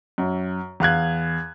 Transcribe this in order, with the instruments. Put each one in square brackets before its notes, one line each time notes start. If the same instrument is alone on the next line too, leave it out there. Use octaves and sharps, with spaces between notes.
[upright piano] F#2
E2 F5 F#6 G#6